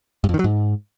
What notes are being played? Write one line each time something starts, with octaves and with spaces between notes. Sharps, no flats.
G2
F2
D#3
F#3
G#2